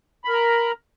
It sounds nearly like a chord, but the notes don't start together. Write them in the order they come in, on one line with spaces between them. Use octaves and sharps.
B5 A#4 A#5